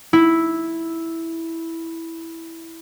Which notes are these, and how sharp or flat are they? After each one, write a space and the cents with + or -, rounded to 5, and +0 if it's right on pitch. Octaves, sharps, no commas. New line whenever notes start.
E4 -5